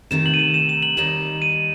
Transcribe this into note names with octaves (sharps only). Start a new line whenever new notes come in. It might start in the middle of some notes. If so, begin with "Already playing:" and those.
C3 D#3 A3 D#4 E7
F#7
D#7
E7
E7
E7
F#7
D#2 D#3 G3 D#4 E7
D#7